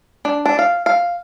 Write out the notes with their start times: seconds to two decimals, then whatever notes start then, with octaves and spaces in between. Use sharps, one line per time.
0.25 D4
0.46 D4
0.59 F5
0.86 F5